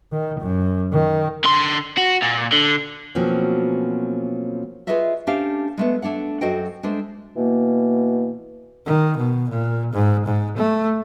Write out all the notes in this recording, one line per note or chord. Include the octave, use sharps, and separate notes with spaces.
D#3
F#2
D#3
D3 C6
F#4
A#2
D3
B2 F3 F#3 A#3 C4 C#4
F4 G#4 B4 C#5 D#5 E5
A3 C#4 D4 G4 C5 F5
G#3 A3 B3
A3 D4 C#5 F#5
F#2 F#4 A4 C5 D#5 G5
G#3 A3 D4 C5
B2 E3 A#3
D#3
B2
A#2
G#2
G#2
A3